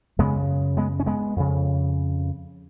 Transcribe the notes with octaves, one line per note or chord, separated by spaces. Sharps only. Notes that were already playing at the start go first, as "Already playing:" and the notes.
F#2 C#3 G#3 B3
G#3 B3
C#4
G#3 B3
F2 C#3